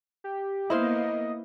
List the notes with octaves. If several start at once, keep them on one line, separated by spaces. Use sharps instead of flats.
G4
A#3 B3 E4 C5 D#5 F5